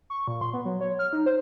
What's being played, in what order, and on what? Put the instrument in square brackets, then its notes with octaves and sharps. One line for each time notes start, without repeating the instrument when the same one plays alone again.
[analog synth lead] C#6
A#2
C6
B3
F#3
C#5
F6
D#4
C5